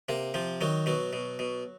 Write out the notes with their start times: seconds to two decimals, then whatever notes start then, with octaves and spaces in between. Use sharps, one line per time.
0.09 C3 A#3
0.34 C3 F3
0.61 D#3 F#3
0.86 B2 F#3
1.13 B2
1.39 B2